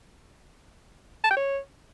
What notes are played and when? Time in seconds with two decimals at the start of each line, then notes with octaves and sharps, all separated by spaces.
1.24 A5
1.30 G5
1.37 C#5